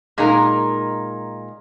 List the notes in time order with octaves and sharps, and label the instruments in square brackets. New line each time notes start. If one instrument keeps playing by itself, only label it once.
[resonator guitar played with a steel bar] A#2 G#3 D#4 A#4